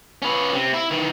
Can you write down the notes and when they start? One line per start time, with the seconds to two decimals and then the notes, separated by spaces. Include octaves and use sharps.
0.22 C#4 B4
0.53 C3
0.73 E4
0.91 D#3 E3